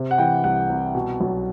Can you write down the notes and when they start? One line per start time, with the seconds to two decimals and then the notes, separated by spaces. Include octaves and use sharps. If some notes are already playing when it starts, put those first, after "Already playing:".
Already playing: C3
0.11 F#5
0.18 E3 G5
0.44 C2 F#5
0.70 C2
0.95 B2
1.20 B1